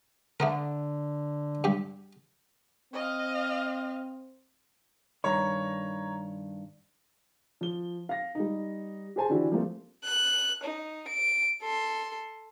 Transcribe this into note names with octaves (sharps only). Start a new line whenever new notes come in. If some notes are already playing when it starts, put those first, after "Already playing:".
D3 A3 B3 A#4
G2 G4
C4 D#5 F5
G2 D#3 C#5 A#5
F3 G7
F5 A#6
G3 D#4
G4 G#4 C5 G#5 A5
D3 E3 D4 E4 F#4 G4
F3 G3 A3 A#3 C4 F4
F#6
D#4
D7
A4 C6